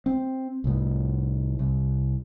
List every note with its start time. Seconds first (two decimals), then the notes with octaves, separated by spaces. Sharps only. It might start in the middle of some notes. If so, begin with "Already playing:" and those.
0.06 C4
0.64 C2 A2
1.59 C2